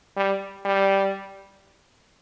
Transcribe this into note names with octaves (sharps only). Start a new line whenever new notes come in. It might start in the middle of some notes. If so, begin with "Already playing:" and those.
G3
G3